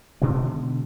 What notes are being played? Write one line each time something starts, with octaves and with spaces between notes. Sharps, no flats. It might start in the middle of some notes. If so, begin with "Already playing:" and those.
B2 D3 D#3 G#3